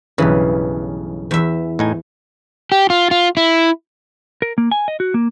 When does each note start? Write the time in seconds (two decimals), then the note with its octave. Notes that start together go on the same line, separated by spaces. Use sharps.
0.18 B1 G2 C#3 E3
1.31 E2 E5
1.79 A2 D#4 G#5
2.72 G4
2.90 F4
3.11 F4
3.37 E4
4.42 A#4
4.58 A#3
4.71 G#5
4.88 D#5
5.00 F#4
5.14 A#3